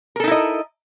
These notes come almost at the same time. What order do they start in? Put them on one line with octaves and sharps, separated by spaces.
A#4 A4 D#4 E4 D#5